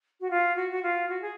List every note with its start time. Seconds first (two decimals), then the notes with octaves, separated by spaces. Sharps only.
0.21 F#4
0.30 F4
0.56 F#4
0.71 F#4
0.83 F4
1.09 F#4
1.22 G#4